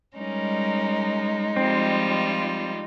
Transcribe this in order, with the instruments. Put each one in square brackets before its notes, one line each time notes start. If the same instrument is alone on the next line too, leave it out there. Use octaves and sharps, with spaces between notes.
[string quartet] G3 C#4 A#4 [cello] G#3 D#4
[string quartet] F3 G3 F4 [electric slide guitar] C4